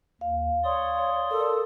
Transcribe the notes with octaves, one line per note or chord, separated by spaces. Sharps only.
D#2 F5
C#5 D5 C6 D#6
A4 A#4